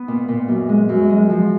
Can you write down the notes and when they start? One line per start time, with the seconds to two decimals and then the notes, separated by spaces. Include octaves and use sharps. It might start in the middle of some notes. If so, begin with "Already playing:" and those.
Already playing: B3
0.08 A#2
0.28 A#2
0.48 F#2
0.69 G#3
0.89 F#2
1.10 G#3
1.30 F3